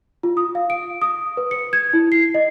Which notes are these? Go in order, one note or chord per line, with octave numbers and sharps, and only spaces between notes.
F4
D#6
F5
D7
D#6
B4
C#7
G#6
E4
C7
D#5